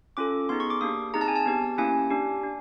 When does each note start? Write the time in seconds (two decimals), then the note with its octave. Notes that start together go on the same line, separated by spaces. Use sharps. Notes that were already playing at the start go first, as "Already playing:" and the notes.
0.17 C#4 F4 A4 D6
0.49 B3 D#4 G#4 C6
0.60 C#6
0.70 D6
0.81 A#3 D4 G4 D#6
1.14 C4 D#4 G#4 A#5
1.21 A5
1.28 G#5
1.36 A5
1.46 B3 D4 G4
1.78 A#3 C#4 E4 G4 G#5
2.10 D4 G4
2.43 D4